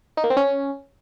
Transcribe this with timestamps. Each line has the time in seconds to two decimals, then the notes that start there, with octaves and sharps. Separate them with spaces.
0.17 D#4
0.24 A#3
0.30 C4
0.37 C#4